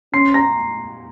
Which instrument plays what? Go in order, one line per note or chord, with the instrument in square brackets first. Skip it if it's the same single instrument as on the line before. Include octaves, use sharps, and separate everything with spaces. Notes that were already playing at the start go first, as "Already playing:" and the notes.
[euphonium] C#4 [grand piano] C6 C7
[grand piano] A#5 A#6